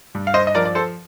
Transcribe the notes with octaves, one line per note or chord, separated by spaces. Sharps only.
G2
F5
C5 D#5
D#5
F3 A#4 D5
D5
A4 C5